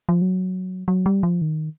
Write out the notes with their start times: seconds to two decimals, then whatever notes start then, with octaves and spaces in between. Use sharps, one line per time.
0.09 F3
0.22 F#3
0.88 F#3
1.06 G3
1.23 F3
1.42 D#3